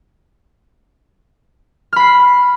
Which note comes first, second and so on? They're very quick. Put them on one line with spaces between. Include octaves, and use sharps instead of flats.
F6 B5 C7